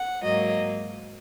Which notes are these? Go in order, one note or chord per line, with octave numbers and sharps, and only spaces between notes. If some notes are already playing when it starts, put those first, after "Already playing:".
Already playing: F#5
G#2 F#3 A#3 D#5